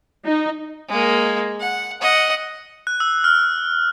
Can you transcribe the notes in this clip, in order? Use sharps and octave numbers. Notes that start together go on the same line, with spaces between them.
D#4
G#3 A#3
F#5
D#5 F#5
F#6
E6
F6